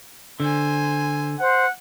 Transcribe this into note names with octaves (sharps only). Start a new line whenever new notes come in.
D3 C5 G#5
C5 F#5